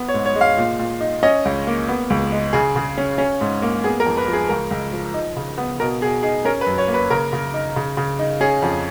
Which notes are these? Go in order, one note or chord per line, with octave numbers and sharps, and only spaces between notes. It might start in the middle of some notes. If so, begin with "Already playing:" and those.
Already playing: B3
C#5
G#2
C#5
G#3
F5
A#2
A#2
D#4
C#4 D#5
C#2
A#3
B3
C#2
G#3
C#3 G#4
C#3
C#4
C#4
G#2
A#3
B3 G#4
A#4
F2
B4
F3
G#4
C#2 A#4
C#2
F3
D#4
C#3
B3
B2 A#4
B2 G#4
D#4 G#4
C#4 A#4
B4
F#2
C#5
A#3
B4
C#3 A#4
C#3
D#4
C#3
C#3
D#4
C#4 G#4
F2